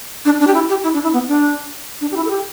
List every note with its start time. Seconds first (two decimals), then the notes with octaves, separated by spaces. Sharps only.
0.25 D4
0.40 D4
0.47 G4
0.54 E4
0.69 G4
0.83 E4
0.94 D4
1.03 E4
1.13 B3
1.28 D4
2.01 D4
2.11 G4
2.16 E4
2.25 A4
2.30 G4